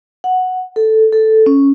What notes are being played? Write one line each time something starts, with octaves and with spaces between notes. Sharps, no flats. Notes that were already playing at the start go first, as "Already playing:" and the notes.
F#5
A4
A4
C#4